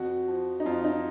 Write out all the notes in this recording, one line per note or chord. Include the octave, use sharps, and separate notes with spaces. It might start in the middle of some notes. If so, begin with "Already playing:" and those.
Already playing: F2 F#4
F3
D#4
F2 F4
D#4